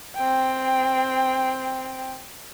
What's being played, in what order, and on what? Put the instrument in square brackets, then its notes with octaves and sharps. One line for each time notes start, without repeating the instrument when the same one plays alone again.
[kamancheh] C4 G5